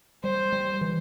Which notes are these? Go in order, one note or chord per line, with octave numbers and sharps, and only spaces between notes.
G3 C5
G3
E3